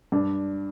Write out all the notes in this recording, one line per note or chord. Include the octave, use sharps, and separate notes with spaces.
G2 D4